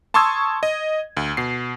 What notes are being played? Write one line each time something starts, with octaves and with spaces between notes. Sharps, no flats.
A5 C6 C#6 D#6 E6 G#6
D#5
D2
B2 C7